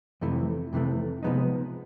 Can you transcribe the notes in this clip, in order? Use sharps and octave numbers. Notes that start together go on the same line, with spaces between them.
F2 C3 E3 A3
F2 C3 E3 A3
C3 F3 G#3 B3 D#4